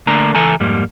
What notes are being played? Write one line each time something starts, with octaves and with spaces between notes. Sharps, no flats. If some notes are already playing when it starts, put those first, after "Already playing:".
D3 A3 A#3 D4 A#5
C#2 E3 A4 G#5 A#5
F2 G#2 G3 A#3